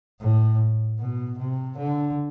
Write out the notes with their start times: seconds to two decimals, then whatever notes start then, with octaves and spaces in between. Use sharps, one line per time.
0.20 A2
0.99 B2
1.38 C3
1.77 D3